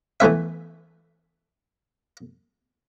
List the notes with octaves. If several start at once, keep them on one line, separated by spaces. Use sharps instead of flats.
E3 A3 B3 E5